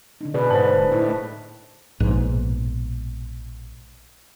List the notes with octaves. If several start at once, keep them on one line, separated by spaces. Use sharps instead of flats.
D3 D4 D#4
B2 G#4 B4 D5
G#2 C5 A5
D1
A2 D#4 E4
A#1 G#2 B2